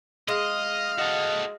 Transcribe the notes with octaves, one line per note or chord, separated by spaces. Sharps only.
G#3 D#5 F5
F#4 A4 D#5